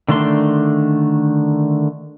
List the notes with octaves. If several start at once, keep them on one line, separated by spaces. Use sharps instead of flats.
D3 D#3 A3 D4 C6